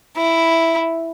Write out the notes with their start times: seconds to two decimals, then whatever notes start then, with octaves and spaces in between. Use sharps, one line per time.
0.17 E4